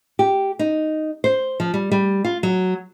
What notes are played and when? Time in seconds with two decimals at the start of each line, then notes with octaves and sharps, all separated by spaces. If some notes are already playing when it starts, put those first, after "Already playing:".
0.19 G4
0.59 D#4
1.24 C5
1.60 F3
1.74 G3
1.92 G3
2.25 F4
2.43 F#3